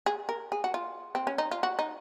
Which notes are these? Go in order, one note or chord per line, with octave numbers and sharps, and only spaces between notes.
G#4
A#4
G#4
F#4
F4
C4
C#4
D#4
F4
F#4
D#4